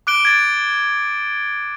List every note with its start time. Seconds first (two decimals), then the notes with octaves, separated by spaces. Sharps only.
0.07 D6 F#6 D7 G7
0.25 G#6 A6